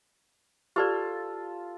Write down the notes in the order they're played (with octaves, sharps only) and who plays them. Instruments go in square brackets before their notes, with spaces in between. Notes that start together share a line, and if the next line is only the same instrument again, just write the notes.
[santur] F4 A4 [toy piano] G4 B4 D5